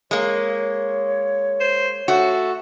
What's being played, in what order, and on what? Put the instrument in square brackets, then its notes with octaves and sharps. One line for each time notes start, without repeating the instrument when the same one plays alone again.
[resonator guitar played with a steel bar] G#3 A#3 [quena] C#5
[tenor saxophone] C5
[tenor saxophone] A3 [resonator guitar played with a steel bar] F#4